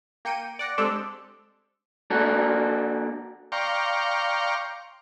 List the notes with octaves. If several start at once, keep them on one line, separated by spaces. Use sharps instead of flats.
A#3 G5 C#7 D#7
D5 F#5 A#6
G#3 C4 D4 G4 A4
A#3 D4 F#4 A4
D5 F5 G5 A#5 C6 C#6